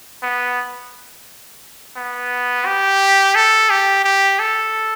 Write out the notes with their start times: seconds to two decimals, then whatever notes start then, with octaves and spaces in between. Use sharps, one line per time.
0.23 B3
1.96 B3
2.66 G4
3.35 A4
3.70 G4
4.04 G4
4.39 A4